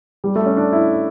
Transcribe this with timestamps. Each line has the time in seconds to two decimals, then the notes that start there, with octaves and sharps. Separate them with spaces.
0.24 G3
0.36 A3
0.46 C#4
0.57 D4
0.72 E4